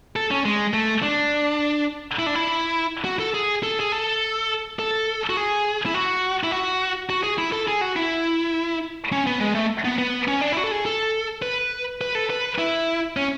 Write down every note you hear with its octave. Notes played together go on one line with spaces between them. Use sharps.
A4
C#4
G#3
A3
D4
E4
D4
E4
F#4
A4
G#4
A4
G#4
A4
A4
F#4
G#4
E4
F#4
E4
F#4
F#4
G#4
E4
A4
G#4
F#4
E4
C#4
B3
G#3
A3
B3
B3
C#4
D4
E4
F#4
A4
G#4
A4
B4
B4
A4
B4
E4
C#4